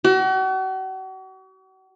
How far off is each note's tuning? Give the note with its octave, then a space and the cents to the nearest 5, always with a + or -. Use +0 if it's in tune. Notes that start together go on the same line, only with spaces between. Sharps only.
F#4 +40